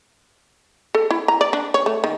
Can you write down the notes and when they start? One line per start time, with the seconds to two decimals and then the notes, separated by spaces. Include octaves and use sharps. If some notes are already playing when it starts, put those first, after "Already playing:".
0.95 A4
1.11 E4
1.28 A#5
1.41 D5
1.53 D4
1.74 C#5
1.86 A3
2.04 D#3